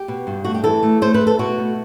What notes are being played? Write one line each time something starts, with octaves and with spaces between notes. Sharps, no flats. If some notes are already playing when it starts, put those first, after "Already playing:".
Already playing: G4
B2
G2
A3 F#4
G4
E3 A4
A3
A3 C5
B4
A3
A4
B2 F#4
A3